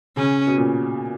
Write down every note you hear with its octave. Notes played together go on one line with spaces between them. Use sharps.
C#3 C#4
B2
A#2